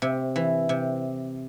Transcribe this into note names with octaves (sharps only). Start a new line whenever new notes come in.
C3
E3
C3